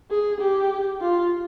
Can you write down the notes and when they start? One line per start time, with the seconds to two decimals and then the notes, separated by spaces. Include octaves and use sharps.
0.11 G#4
0.41 G4
1.01 F4